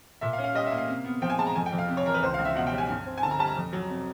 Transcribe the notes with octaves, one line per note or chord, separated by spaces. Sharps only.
A#2 E5
F5
C#4
F5
G3 D#5
E5
A#3
F5
C3
B3
F3 G5
G#5
G#3 A5
A#5
F2 G#5
G5
F2
F5
C3
C#5
E3 A#4
B4
C#2 C5
F5
C#2
E5
B2 F#5
G5
G3
G#5
G2
C4
G#5
D3 A5
A#5
G3 A5
A#5
F2
F#3
C3